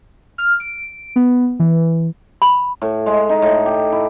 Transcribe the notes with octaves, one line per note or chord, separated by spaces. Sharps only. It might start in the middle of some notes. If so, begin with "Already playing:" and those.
F6
D7
B3
E3
B5
A2
G#3
D#4
A2
G4
E4